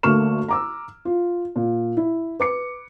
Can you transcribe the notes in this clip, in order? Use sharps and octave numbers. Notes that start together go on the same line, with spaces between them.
D2 A3 A#3 C#6 F6 E7
A#5 D6 E6
F4
A#2
E4
B4 D6 C#7